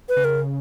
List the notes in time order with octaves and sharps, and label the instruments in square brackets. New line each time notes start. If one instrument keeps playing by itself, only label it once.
[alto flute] B4
[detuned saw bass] C#3
[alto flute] A#4